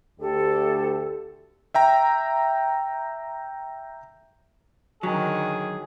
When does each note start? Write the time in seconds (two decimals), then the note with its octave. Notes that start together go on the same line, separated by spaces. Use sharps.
0.20 D2 G4 A4
1.74 E5 G5 A#5
5.03 D3 D#3 F#3 G#4